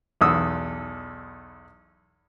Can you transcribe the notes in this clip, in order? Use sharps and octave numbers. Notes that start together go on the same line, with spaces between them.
B1 E2 D#6 E6